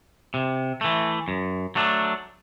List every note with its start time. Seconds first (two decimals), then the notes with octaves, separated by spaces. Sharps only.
0.34 C3
0.81 E3 A3
1.28 F#2
1.75 F#3 A3 D4